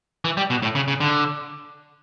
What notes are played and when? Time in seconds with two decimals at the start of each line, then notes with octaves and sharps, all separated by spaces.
0.25 E3
0.37 G3
0.50 B2
0.63 A2
0.75 C#3
0.88 C#3
1.00 D3